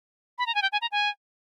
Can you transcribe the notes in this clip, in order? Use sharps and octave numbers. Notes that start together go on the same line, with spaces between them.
B5
A#5
G#5
G5
G#5
A#5
G#5